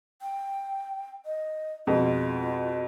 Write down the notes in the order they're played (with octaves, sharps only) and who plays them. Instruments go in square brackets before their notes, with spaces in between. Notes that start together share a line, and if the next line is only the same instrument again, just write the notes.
[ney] G5
D#5
[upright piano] F2 B2 G#3 [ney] F4